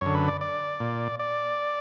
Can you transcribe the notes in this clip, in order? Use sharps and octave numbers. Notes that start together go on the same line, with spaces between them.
F#2 D3 C#5
B4
D5
D5
A#2
D5